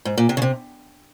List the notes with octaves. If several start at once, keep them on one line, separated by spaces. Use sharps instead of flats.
G#2
A#2
C3
C#3
C3